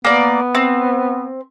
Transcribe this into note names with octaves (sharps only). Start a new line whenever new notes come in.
A#3 B3 D5
C4